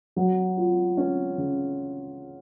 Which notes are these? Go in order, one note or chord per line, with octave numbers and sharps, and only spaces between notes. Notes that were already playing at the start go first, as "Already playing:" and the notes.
F#3
F4
C#4
C#3